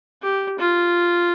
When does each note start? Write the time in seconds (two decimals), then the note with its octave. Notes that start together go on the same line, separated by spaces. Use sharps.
0.22 G4
0.59 F4